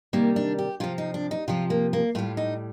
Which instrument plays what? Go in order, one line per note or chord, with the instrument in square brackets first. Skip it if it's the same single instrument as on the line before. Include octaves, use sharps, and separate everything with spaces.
[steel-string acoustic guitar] C3 D#3 G3 A#3
D4
G4
C3 F3 F4
D#4
D4
D#4
C3 F3 F4
A#3
A#3
A2 G3 F4
D#4